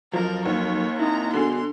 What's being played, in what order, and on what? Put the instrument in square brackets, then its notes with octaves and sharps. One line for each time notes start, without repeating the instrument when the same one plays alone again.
[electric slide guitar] F2 F#3 [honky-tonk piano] F3 [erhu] A#4
[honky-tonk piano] D#2 [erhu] C#5
[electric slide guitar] C4 D#4 E4 [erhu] A#5
[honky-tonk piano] D3 [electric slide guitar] B3 F#4 G#4 [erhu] C6